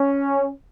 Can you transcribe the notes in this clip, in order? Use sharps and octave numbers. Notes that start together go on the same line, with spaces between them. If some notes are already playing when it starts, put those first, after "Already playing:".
Already playing: C#4